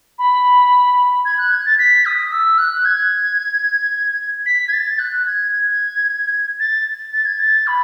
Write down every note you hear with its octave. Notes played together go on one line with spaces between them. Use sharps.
B5
G#6
F#6
G#6
A6
B6
D#6
E6
F#6
G#6
B6
G#6
A6
F#6
G#6
G#6
A6
A6
G#6
A6
B5